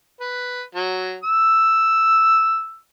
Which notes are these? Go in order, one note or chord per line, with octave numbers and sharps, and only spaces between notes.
B4
F#3
E6